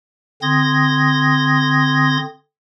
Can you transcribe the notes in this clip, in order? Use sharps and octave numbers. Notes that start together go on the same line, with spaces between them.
D3 C4 C6 D#6 G#6 A#6